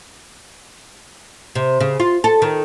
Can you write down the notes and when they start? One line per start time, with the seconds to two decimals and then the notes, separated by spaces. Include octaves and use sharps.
1.55 C3
1.80 C#3
2.00 F4
2.24 A4
2.42 D#3